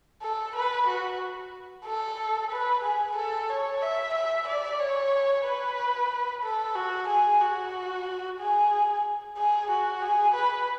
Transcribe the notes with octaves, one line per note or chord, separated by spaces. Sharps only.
A4
B4
F#4
A4
B4
G#4
A4
C#5
E5
E5
D5
C#5
B4
A4
F#4
G#4
F#4
G#4
G#4
F#4
G#4
B4